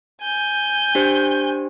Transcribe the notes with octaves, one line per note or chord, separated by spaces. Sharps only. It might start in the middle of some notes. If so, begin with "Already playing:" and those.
G#5 G6
D4 G4 C5